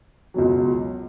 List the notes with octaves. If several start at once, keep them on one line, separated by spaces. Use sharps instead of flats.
C#2 B2 F#3